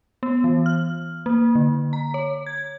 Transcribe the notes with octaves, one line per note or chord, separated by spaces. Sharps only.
B3
E3
F6
A#3
D3
A#5
C#5
G#6